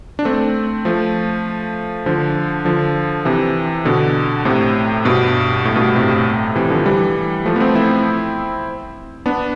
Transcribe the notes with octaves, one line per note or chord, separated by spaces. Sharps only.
D4
A3 C4
F3 A3
D3 F3
D3 F3
C3 E3
B2 D3
A2 C3
G2 B2
A2
G2 B2
A2
A2 C3
C3 E3
D3 F3
E3 G3
F3 A3
B3
A3 C4
C4 E4
B3 D4